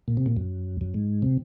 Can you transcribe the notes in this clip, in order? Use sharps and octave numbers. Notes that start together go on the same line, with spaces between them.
A#2
C3
A#2
F#2
F#2
G#2
C3